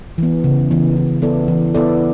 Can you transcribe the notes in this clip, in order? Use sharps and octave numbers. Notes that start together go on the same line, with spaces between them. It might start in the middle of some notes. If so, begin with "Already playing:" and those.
E3 B3
C#3
E3 B3
E3
B3 E4 A4 D5
E3
B3 E4 A4 D5